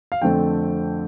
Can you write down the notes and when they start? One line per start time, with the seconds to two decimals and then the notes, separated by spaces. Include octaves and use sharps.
0.12 F5
0.22 F2 D3 A3 C4 G5